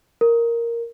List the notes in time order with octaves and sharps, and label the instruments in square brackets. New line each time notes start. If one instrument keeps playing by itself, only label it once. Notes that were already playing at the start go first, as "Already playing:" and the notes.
[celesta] A#4